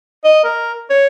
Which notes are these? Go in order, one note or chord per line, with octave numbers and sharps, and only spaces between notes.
D#5
A#4
C#5